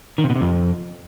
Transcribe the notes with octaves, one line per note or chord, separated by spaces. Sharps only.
D#3
C3
B2
C3
F2